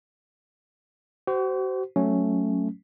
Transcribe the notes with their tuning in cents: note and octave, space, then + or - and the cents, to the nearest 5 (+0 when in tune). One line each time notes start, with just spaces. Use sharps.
F#4 +40 C5 -15
F#3 +0 A3 +0 C#4 +0